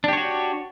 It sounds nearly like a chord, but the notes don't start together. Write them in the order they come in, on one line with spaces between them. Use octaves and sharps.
D4 G4 C#5 F#4